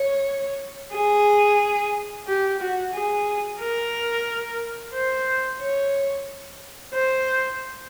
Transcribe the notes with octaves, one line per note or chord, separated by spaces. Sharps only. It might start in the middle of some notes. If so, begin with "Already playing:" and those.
Already playing: C#5
G#4
G4
F#4
G#4
A#4
C5
C#5
C5